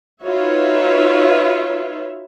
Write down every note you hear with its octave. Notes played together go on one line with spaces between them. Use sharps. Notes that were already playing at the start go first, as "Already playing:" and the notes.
D#4 F4 F#4 B4 C#5 E5